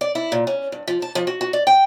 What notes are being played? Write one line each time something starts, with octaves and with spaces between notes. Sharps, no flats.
D5
E4
A#2
C#4
G2
F3
A5
F3
F#4
F#4
D5
G5